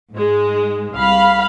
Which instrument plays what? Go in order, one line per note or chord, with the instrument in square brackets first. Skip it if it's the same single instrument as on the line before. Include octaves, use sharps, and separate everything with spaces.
[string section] G#2 G#3
[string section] C2 [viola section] F5 B5